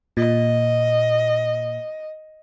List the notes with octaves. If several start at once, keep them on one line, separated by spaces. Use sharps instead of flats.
A#2 D#5